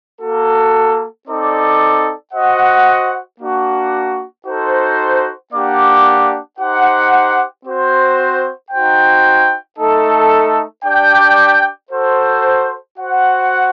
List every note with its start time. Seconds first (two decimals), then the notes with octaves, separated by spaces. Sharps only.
0.21 A#3 F#4 A4
1.28 C4 D#4 A4 D5
2.33 F#4 C5 D#5 F#5
3.40 A#3 D4 F#4
4.46 D#4 F#4 A4 C5
5.52 A#3 D4 G4 D5 F#5
6.59 D#4 G4 C5 F#5
7.66 C4 F#4 C5
8.71 D#4 F#4 C5 G5
9.78 A3 D#4 A4
10.83 D4 G4 D5 G5
11.91 F#4 A4 C5
12.97 F#4 C5 F#5